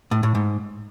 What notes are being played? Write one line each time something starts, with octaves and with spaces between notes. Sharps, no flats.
A2
A2
G#2